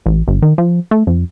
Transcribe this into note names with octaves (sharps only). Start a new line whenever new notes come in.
A1
G1
D#3
F3
A3
F2